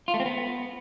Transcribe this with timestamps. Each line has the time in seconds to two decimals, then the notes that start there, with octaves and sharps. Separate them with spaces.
0.08 F4
0.14 A3
0.20 C4
0.26 B3